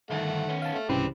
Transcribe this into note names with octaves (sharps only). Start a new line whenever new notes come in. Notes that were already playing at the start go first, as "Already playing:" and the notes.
D2 G2 D#3 A3 F#5
B3 C#4
F5 A5
A3
C2 G#2 C#3 E3 C4 D4 G4 B4